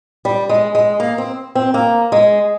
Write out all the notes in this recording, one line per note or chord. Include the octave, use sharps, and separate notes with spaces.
G3
G#3
G#3
A#3
C4
C4
A#3
G#3